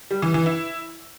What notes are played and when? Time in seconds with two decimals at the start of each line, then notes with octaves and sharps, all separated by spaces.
0.11 G3
0.22 E3
0.34 E3
0.46 E4